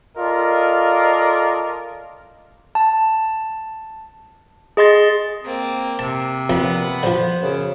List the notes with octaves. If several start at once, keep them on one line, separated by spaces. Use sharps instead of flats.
F4 A4 A#4 D5 D#5
A5
G#4 D#5 C6 A6
A#3 C4
C3 A5
F2 A#2 F3 B3 B5
D3 F3 C5
F#2 C#3